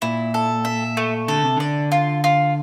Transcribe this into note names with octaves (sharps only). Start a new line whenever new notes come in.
A#2 E4
A4
E5
A3
D3 A4
C3
D3 D5
F4
F4